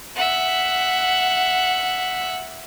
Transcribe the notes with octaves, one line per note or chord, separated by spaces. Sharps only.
E5 F#5